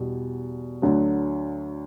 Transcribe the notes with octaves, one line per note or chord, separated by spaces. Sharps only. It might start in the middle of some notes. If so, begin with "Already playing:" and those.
Already playing: E2 B2 G3
D2 D3 F#3